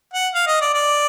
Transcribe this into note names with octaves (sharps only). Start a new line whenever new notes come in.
F#5
F5
D#5
D5
D5